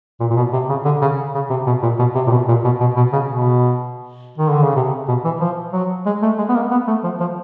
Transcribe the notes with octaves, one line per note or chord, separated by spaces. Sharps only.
A#2
A#2
B2
C3
C#3
D3
C#3
C#3
C3
B2
A#2
B2
C3
A#2
B2
A#2
B2
B2
B2
C#3
B2
D#3
D3
C#3
C3
B2
E3
F3
F#3
G#3
A3
G#3
B3
A#3
B3
A3
F3
F3